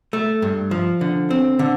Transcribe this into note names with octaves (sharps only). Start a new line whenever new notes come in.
A3
G2
F3
D3
C4
D3